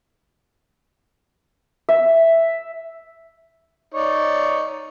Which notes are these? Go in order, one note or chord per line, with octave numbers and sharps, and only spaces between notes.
E5
D#4 C#5 D5